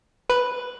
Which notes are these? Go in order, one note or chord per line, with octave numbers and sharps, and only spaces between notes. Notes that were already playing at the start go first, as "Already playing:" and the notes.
B4